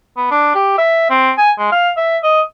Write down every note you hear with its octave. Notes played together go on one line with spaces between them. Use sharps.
B3
D4
G4
E5
C4
G#5
G#3
F5
E5
D#5